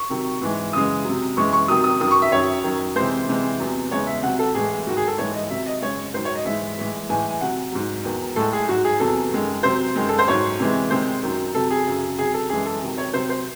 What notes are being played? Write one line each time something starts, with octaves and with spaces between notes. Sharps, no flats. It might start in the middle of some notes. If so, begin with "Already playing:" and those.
Already playing: C#6
C3 D#3 F#3
G#2 E3 G#3
F#2 C#3 E3 G#3 D#6
C3 F#3
F#2 E3 G#3 C#6
C#6
C3 D#3 F#3 D#6
D#6
F#2 D#3 F#3 D#6
C#6
E5
F#2 D#3 F#3 C#5
F#2 D#3 F#3
C3 E3 G#3 C5
C3 E3 G#3
E2 C3 F#3
E2 C#3 G#3 C#5
E5
C3 F#3 F#5
A4
A2 E3 G#3 G#4
G#2 D#3 F#3 F#4
G#4
A4
G#2 E3 G#3 C#5
D#5
C3 F#3 E5
D#5
F#2 C#3 G#3 C#5
G#2 D#3 F#3 C5
C#5
D#5
G#2 E3 G#3 E5
A2 E3 G#3
A2 E3 G#3 G#5
C3 F#3 F#5
G#2 F#3
E2 D#3 F#3
A2 G#3 A4
G#4
G#2 F#3 F#4
G#4
E2 C3 F#3 A4
F#2 D#3 G#3
C3 F#3 C5
F#2 D#3 G#3
A4
C5
G#2 F#3 C#5
C3 E3 G#3
C3 D#3 G#3 C5
F#2 D#3 F#3
C3 F#3 A4
G#4
F#2 C#3 F#3
C3 F#3 G#4
A4
F#2 E3 G#3 G#4
A4
C3 D#3 F#3
C#5
C3 F#3 C5
C5